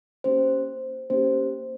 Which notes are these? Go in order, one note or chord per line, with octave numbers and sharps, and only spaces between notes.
A#3 C#4 G4 C5
A#3 C#4 G4 C5